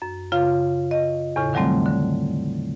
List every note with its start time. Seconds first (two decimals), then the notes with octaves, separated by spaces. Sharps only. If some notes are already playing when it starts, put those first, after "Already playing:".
0.02 F#2
0.32 F#2 C#3 F4 F5
0.91 D#5
1.36 E2 A2 C#3
1.53 D3 D#3 F#3 G3 A3 C4
1.86 D3